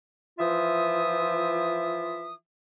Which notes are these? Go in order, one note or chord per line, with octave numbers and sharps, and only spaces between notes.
E3 F3 F4 E5 D#6